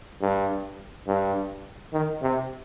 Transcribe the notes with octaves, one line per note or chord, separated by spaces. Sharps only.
G2
G2
D#3
C3